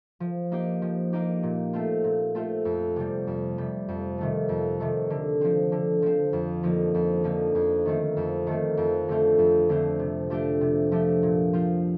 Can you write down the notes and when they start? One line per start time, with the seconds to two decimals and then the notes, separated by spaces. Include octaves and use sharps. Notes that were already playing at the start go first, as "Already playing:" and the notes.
0.20 F3
0.52 A#3 D#4 G4
0.82 F3
1.13 A#3 D#4 G4
1.43 A#2
1.73 A3 C4 F4
2.04 A#2
2.35 A3 C4 F4
2.65 F2
2.96 C3 G3
3.27 F2
3.58 C3 G3
3.88 F2
4.18 C3 D#3 A3
4.49 F2
4.80 C3 D#3 A3
5.10 D3
5.41 F3 C4
5.72 D3
6.02 F3 C4
6.33 F2
6.63 D3 F3 A#3 D#4
6.94 F2
7.24 D3 F3 A#3 D#4
7.55 F2
7.85 D#3 A3 C4
8.17 F2
8.47 D#3 A3 C4
8.77 F2
9.08 D3 A3 C4 F4
9.38 F2
9.69 D3 A3 C4 F4
9.99 C3
10.30 F3 A3 D4 G4
10.61 C3
10.92 F3 A3 D4 G4
11.23 A#2
11.53 F3 C4 F4